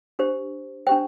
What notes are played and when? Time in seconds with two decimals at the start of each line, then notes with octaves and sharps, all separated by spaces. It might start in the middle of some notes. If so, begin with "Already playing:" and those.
0.19 D4 G4 C5
0.87 D4 G4 C5 G5